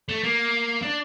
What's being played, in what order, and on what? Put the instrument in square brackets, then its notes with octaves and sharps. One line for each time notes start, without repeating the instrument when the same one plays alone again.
[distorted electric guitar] A3
A#3
D4